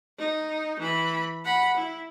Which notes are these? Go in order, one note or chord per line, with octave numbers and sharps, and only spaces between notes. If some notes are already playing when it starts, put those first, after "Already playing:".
D#4
E3 B5
F#5 B5
E4